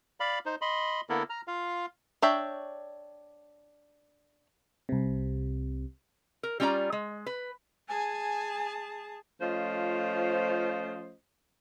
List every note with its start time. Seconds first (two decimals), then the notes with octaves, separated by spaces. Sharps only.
0.20 D5 F5 B5
0.46 D#4 C5
0.61 D#5 B5 C6
1.09 D3 A#3 B3 E4 A4 A#4
1.30 A#5 F6
1.48 F4 F5
2.22 D4 C#5 E5 G5
4.89 C2 C3
6.43 A#4
6.60 G3 C#4 F4 D5 A#5
6.92 G#3
7.26 B4
7.89 G#4 G#5 A5
9.41 F3 A3 C#4 F4 C5 D#5